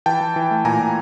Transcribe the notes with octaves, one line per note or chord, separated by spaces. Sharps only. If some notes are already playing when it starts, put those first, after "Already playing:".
E3 G5 A5
E3
E3
A3
A#2 G#5 A#5
A#2